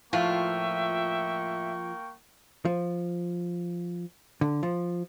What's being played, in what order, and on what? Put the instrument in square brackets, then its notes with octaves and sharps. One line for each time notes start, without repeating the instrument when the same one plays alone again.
[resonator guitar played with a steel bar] A2 F4 [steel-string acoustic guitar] F3 [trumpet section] A#3 G5 C#6 [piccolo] E5
[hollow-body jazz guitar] F3
D3
F3